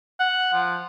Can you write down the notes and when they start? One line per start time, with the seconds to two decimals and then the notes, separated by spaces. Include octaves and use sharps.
0.20 F#5
0.54 F3